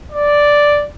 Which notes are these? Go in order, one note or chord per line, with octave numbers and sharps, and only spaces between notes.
D5